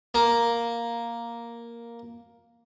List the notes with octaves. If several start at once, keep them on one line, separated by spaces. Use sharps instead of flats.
A#3